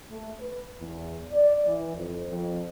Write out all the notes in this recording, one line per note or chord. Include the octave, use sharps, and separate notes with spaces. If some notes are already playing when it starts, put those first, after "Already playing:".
A3
B4
E2
D5
E3
F2
F2